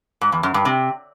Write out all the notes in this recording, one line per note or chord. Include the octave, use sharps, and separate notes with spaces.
G#2
E2
F#2
G2
C3